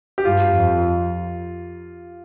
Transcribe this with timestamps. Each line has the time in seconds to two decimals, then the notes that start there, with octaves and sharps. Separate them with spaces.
0.18 G4
0.25 G2 F4
0.55 F2